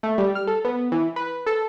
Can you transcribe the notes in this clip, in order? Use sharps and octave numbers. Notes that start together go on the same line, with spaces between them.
A3
G3
F6
A4
B3
E3
B4
A4